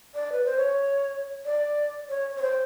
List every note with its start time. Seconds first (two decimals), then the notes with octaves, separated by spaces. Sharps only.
0.15 D5
0.32 B4
0.45 C5
0.57 C#5
1.45 D5
2.09 C#5
2.36 C#5
2.42 C5